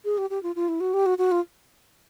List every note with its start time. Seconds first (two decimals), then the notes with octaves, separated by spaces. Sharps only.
0.05 G#4
0.18 G4
0.30 G4
0.43 F4
0.56 F4
0.68 E4
0.80 F#4
0.94 G4
1.06 F#4
1.18 F#4
1.31 F4